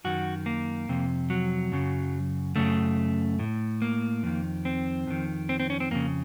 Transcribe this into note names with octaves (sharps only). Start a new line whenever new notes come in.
F#2 D#3 F#4
A#3
F2 C3
F#3
F#2 C#3
F#2 C#3 A3
A2
A#3
F2 D#3
C4
F2 D#3
C4
C4
C#4
C4
F2 C#3 A#3